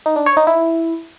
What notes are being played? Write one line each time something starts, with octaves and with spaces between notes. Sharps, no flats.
D#4
D4
C#5
D#4
E4